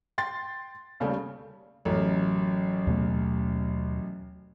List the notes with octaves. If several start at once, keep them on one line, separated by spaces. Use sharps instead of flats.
G5 C6 A6
D#2 C#3 G3 A3
A1 F#2
D#2 B2 A3